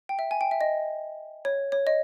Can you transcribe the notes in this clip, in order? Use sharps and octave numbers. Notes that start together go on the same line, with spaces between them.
G5
E5
G#5
G5
E5
D#5
C#5
C#5
D#5